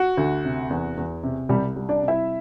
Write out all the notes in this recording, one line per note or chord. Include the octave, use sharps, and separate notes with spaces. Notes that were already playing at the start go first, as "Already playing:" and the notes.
Already playing: F#4
D2
C3
E2
E2
C3
C2 G3 G4
G3
D4 D5
C3
E4 E5